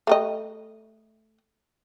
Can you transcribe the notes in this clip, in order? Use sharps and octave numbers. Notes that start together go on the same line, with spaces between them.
A3 G4 D#5